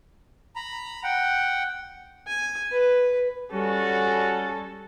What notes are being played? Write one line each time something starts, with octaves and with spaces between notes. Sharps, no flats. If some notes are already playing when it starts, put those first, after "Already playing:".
A#5 B5
F#5 G5
G#5
B4
G3 C#4 F#4 A4